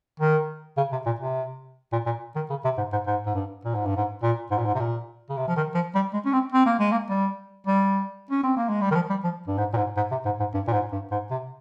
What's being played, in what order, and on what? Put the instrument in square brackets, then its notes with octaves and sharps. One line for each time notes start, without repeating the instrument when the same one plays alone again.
[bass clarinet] D#3
C#3
C3
A#2
C3
A#2
A#2
D#3
C#3
C3
G#2
G#2
G#2
G#2
G2
A#2
G#2
G2
G#2
A#2
G#2
A#2
G#2
C3
A#2
C#3
C3
F3
D#3
F3
G3
G#3
C#4
C4
C4
A#3
G#3
A#3
G3
G3
C#4
C4
A#3
G#3
G3
D#3
F3
G3
F3
G2
G#2
A#2
G#2
G#2
C3
G#2
G#2
G2
A#2
G#2
G2
G#2
C3